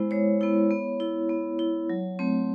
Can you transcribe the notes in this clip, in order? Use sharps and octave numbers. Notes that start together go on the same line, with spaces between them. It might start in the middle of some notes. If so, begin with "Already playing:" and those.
Already playing: G#3 B3 E4 C5
G#3 C#5
B3 E4
B3
E4
B3
E4
F#3
A3 C4